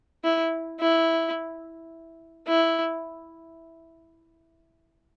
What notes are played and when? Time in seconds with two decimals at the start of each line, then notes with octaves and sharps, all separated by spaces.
0.24 E4
0.80 E4
2.48 E4